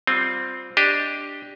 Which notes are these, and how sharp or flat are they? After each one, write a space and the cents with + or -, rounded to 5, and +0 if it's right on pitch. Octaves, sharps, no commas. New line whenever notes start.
G3 +0 C4 +0 F4 +15
D4 +0 G4 +0 D#5 +10